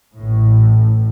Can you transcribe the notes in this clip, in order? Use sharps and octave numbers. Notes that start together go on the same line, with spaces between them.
A1 A2